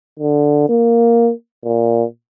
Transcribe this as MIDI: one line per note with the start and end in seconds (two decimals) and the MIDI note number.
0.19 0.65 50
0.69 1.31 58
1.64 2.04 46